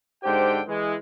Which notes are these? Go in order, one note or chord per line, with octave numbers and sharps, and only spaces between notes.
G#2 D3 G4 C5 G5
E3 G#3